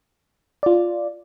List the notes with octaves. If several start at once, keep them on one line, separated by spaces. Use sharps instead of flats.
F4 D5